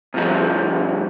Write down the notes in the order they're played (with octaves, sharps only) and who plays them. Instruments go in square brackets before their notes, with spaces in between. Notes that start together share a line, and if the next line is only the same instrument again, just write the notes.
[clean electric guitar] D2 G2 F3